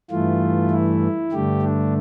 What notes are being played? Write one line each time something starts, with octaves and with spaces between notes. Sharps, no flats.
G2 E3 A3 F4
E4
G2 D3 A3 G4
D4